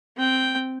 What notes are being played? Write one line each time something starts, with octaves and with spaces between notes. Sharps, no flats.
C4 G5